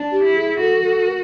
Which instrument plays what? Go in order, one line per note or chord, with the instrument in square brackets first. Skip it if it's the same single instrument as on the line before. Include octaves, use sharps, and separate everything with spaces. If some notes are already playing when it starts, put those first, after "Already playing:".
Already playing: [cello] D4
[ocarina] G4
[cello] E4
[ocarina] G#4
[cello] F#4 [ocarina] A4
[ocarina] A4
A#4